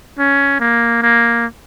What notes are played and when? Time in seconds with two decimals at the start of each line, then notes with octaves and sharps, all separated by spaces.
0.19 C#4
0.60 A#3
1.02 A#3